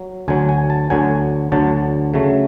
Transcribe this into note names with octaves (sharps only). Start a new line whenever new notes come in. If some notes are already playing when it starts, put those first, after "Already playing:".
Already playing: F#3
D2 D3 F#3 G#5
G#5
A5
D2 D3 F#3 G#5
D2 D3 F#3 A5
C#3 F#3 A3